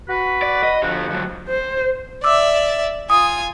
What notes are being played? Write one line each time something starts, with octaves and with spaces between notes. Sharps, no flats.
F#4 B4
D5
D#5
D3 F3 F#4 G4
D3 F#3
C5
D5 E5 D6 E6
F4 G#5 D#6